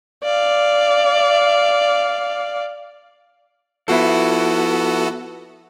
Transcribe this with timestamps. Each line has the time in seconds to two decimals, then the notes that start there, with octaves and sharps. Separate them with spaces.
0.24 D5 F5
3.88 F3 B3 E4 F#4 A4